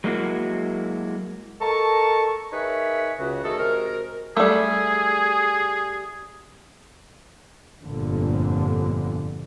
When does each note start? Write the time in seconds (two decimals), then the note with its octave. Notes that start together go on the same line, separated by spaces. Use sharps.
0.04 F#3 G#3 A#3 E4 F#4
1.61 A4 A#4 D#5 A5 C#6
2.53 D#4 G#4 A#4 B4 C#5 E5
3.19 C#2 C#3 F#4
3.44 D#3 A3 F#4 G#4 A4
3.58 C3 G#3 F#4 A#4
4.37 G3 A3 G#4
7.84 G1 F2 A#2 D3